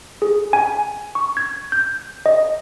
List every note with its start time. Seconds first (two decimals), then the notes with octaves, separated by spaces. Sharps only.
0.22 G#4
0.53 G#5
1.15 C#6
1.37 G#6
1.72 G6
2.26 D#5